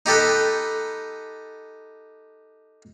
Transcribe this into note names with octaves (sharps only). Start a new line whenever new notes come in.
D#4 G4 A4 B4